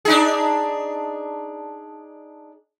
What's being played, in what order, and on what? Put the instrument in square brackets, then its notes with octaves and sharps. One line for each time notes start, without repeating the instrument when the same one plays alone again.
[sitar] D4 D#4 G#4